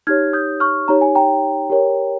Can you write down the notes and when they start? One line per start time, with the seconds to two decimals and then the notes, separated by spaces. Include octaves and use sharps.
0.07 D#4 G4 C#5 F6 G#6
0.33 D#6 G6
0.60 C#6 F6
0.88 D#4 G4 C#5 A#5
1.01 G#5
1.15 G5 A#5
1.70 G4 A#4 C#5